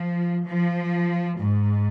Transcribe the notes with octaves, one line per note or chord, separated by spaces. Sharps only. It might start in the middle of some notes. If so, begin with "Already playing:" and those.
Already playing: F3
F3
G#2